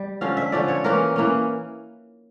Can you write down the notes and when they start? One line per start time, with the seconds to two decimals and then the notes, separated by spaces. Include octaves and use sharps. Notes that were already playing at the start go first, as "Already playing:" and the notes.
Already playing: G3
0.21 D3 F3 C#4 F5
0.37 E5
0.52 D3 F3 C#4 D5
0.68 C#5
0.84 E3 A#3 C#4 A#4
1.16 E3 A#3 C#4